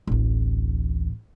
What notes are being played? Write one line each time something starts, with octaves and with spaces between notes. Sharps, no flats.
D1 A1